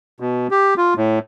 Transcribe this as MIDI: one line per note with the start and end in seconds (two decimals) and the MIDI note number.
0.20 0.47 47
0.51 0.74 67
0.77 0.94 65
0.97 1.19 45